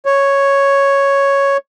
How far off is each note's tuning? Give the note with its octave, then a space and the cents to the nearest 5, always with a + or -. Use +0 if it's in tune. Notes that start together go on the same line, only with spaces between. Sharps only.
C#5 +0